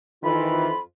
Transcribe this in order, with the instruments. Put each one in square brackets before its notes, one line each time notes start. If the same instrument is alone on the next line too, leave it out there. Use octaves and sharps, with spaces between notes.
[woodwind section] F2 F4 B5 [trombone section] D#3 E3